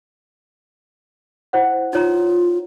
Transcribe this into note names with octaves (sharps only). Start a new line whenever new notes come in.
E4 C5 F#5
D#4 F4 C#5 A#5